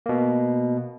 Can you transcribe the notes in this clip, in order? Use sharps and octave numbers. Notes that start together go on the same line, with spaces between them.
B2 A#3